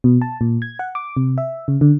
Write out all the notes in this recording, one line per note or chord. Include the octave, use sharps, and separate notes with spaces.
B2
A5
A#2
G#6
F#5
D6
C3
E5
C#3
D3